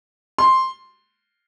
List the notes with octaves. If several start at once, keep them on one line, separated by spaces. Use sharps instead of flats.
C6